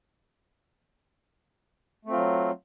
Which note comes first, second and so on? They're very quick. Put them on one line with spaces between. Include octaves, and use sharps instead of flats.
A3 C4 F4 F#3